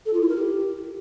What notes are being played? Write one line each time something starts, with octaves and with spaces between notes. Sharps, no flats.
A4
F4
E4
A#4
G4